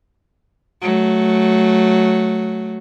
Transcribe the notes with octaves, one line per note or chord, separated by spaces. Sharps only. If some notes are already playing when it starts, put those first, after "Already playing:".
F#3 A3